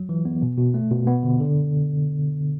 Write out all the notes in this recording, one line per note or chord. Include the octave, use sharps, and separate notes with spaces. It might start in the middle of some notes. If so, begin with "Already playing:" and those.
Already playing: F#3
E3
B3
B2
B2
A3
B2
B3
D3
D3